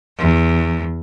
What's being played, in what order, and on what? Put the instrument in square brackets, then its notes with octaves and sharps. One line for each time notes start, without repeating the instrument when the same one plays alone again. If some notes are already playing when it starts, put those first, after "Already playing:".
[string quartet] E2